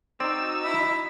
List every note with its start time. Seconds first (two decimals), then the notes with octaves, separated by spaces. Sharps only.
0.20 C4 D#4 F#4 D5 E6
0.64 E4 B5